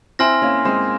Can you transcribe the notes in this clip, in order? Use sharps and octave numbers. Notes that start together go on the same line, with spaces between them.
C4 E4 G#5 C6 F6 A#6
A#3 C#4
G#3 C4